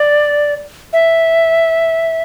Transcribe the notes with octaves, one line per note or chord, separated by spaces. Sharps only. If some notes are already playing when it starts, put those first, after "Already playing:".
Already playing: D5
E5